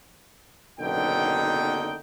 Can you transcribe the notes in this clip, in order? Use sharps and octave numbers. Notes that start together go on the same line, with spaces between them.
F#1 B1 B2 D3 D#4 G5